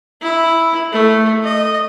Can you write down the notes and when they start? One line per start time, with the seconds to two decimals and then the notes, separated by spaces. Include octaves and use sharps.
0.22 E4
0.92 A3
1.44 D#5